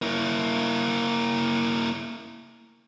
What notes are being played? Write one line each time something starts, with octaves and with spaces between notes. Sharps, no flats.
A#3 E4